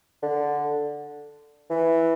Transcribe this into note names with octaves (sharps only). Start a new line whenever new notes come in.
D3
E3